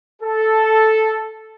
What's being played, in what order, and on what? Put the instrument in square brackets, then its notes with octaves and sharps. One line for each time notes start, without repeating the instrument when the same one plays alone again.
[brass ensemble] A4